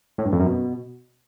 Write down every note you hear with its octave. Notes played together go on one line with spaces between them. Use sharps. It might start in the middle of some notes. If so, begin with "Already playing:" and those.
A2
G2
F2
F#2
B2